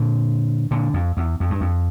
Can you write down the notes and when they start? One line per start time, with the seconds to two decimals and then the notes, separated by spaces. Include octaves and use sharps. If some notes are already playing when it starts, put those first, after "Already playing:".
Already playing: A#2 D3
0.71 A#2 D3
0.94 F2
1.17 E2
1.40 F2
1.50 G2
1.61 F2